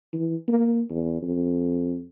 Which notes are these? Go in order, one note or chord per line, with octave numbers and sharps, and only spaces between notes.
E3
A#3
E2
F2